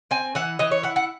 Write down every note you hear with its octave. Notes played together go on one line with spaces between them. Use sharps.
C4 G#5
E3 F#5
E3 D#5
C#5
E4 F#5
F#5